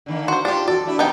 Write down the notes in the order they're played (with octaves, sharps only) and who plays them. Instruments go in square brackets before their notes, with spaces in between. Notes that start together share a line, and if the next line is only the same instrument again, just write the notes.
[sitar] D3 D#3 A#3
[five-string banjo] F#4 C5 [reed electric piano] C6
[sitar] G#2 F4 G4 [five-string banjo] D4 D5
[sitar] F2 B2 A4 [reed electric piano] F#4 [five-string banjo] D5
[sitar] A3 D4 E4
[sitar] C3 A#3 [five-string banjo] B3 D#4 G5